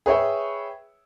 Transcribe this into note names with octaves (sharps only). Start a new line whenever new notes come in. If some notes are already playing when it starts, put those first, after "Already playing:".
G#4 B4 C#5 E5 G5